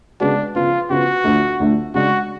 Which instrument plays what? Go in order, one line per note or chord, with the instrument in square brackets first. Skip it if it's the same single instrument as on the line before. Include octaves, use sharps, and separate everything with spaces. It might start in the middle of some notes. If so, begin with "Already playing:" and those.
[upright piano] C#3 G#3 B3 F#4 [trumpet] D4
[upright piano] C#3 F3 B3 [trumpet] F4
[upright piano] C#3 F3 B3 [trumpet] F#4
[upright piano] D2 D3 F3 A3
D2 D3 F3 A3
[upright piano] C#3 G#3 D4 [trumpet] F#4